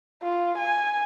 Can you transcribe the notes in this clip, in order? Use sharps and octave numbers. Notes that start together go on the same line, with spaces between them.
F4
G#5